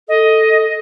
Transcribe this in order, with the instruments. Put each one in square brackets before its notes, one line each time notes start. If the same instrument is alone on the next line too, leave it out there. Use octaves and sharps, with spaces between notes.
[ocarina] A4 [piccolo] D#5